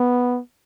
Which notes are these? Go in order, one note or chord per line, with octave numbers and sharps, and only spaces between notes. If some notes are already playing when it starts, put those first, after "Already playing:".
Already playing: B3